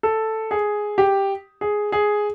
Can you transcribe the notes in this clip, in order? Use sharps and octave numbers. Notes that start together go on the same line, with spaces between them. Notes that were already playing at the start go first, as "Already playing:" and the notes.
A4
G#4
G4
G#4
G#4